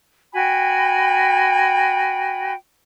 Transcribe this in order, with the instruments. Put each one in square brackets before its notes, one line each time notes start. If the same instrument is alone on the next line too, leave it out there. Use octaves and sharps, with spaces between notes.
[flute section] F#4 G5 G#5 B5